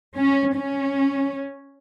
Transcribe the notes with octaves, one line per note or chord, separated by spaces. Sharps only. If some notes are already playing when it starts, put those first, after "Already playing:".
C#4
C#4